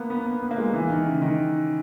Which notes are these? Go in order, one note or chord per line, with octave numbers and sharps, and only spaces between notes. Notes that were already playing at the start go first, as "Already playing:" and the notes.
Already playing: A#3 B3
B3
B3
B3
A#3
G#3
E3
D#3
C#3
D#3